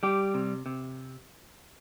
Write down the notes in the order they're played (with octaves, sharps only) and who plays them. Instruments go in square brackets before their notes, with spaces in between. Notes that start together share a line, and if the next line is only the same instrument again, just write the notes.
[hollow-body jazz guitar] G3 G4
C3
C3